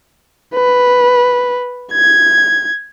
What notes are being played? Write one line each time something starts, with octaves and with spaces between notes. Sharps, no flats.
B4
G#6